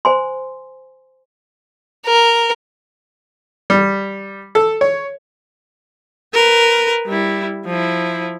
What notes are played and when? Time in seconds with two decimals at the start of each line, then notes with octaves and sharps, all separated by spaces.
0.05 C5 G#5 C6
2.06 A#4
3.70 G3
4.55 A4
4.81 C#5
6.34 A#4 B4
7.07 G3 E4
7.65 F3 E4